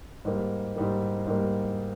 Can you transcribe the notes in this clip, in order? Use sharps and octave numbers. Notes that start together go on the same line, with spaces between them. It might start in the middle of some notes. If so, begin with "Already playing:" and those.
G#2 G3 A#3
G#2 G3 A#3
G#2 G3 A#3